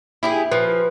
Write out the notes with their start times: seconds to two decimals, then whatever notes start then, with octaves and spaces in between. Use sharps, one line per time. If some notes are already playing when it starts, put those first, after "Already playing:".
0.23 E4 G4 G#4 E5
0.52 F3 B4